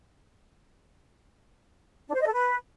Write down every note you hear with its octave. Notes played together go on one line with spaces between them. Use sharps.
D4
C5
D#5
A4
B4